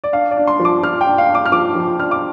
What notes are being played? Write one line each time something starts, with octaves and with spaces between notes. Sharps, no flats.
D5
D4 F5
D5
D4
C6
F3
D6
F3 F6
G5
D4
F5
D4
D6
F6
F3 D6
F3
D4 F6
D6